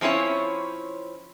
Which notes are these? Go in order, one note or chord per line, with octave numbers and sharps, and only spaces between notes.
F3 C4 C#4 E4 C#5